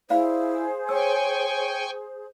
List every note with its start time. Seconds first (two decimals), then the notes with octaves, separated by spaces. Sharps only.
0.10 E4 G#4 C5 D5 F5 B5
0.89 C#5 G5 G#5 C#6 E6